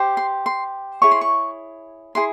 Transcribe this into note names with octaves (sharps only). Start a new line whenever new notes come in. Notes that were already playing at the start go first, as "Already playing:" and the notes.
Already playing: G4 C5
C6
C6
E4 G#4 C#5 C#6
C6
C#6
E4 G#4 C6